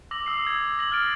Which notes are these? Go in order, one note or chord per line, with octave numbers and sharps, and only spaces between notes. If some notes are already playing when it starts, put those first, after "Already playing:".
D6 E6 A#6 F#7
D#6 E6 C7
G#6
E6 A#6 F#7
F6 A6 D7 F#7